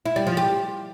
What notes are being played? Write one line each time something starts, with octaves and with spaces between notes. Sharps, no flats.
E4
G3
F3
G4